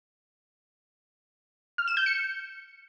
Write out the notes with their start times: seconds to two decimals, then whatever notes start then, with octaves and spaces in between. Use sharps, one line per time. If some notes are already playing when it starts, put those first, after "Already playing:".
1.78 F6
1.88 E7
1.97 G6
2.06 C#7